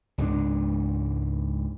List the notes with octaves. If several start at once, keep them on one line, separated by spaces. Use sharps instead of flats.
C#2 G#2 F#3 D4